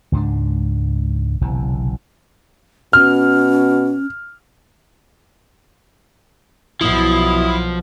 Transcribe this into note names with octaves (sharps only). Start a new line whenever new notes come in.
C#2 G#2 F#3 D4
F#1 B1 C3 E3
B2 C#4 F6
B1 B2 F3 E4 D#6